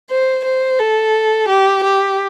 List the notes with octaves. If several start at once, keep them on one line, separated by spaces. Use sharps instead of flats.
C5
C5
A4
G4
G4